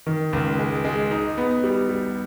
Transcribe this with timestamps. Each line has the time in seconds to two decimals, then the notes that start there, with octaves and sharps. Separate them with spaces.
0.07 D#3
0.33 C#2
0.59 G#3
0.85 G#3
1.11 D#4
1.38 B3
1.64 G3
1.89 G3